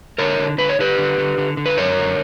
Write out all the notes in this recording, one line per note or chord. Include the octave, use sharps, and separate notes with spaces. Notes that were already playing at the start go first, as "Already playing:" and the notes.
D3 A#4 C#5
D3
D3 B4
C#5
D3 G4 B4
D3
D3
D3
D3
B4
F#2 A#4 C#5
D3